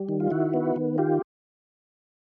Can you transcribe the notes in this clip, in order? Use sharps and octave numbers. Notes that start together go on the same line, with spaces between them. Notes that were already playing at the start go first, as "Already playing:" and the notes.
Already playing: G3
D#3
F4
D#3 E4 F#4
B3
D#3
F4 G4